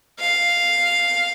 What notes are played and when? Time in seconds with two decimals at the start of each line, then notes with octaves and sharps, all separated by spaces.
0.19 F5